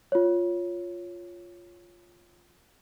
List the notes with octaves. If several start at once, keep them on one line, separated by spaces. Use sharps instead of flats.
F4 C#5